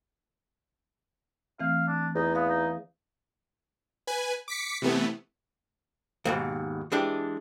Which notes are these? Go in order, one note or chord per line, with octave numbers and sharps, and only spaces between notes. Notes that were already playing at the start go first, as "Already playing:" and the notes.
E3 A3 C4 F5
D4
E2 D#4
B3 F5 D#6
D#4
B4 G#5
D6 B6 C#7
C3 E3 A3 B3
D#2 G#2 B2
E3 G#3 D4 G4